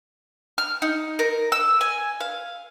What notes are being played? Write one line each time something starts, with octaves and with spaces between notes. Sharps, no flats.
F6
D#4
A#4
E6
G#5
F5